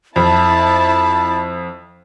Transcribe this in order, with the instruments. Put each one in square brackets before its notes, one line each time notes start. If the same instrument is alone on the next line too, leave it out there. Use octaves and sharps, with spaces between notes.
[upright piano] F2 [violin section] E4 A5 [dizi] B5